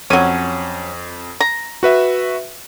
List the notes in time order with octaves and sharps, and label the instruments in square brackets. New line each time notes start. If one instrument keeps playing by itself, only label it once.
[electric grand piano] F2 D#7 [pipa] F#3 C#4
[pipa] A#5
[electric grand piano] F#4 B4 E5